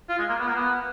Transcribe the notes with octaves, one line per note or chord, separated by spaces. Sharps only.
F4
G#3
A#3
B3
A#3
B3